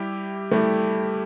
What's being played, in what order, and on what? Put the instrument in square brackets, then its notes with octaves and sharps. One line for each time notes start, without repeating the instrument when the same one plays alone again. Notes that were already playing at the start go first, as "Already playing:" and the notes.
Already playing: [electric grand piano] G3 E4 G4
[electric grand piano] G3 E4 G4 [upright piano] A3